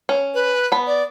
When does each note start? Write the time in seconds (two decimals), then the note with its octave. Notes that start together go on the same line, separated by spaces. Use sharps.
0.09 C#4
0.34 B4
0.72 B3 B5
0.87 D5